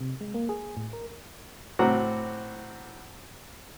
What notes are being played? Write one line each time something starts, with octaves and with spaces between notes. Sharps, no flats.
C3
G#3
A#3
G#4
A2
A#4
A2 C4 F#4 F#5 A#5 D6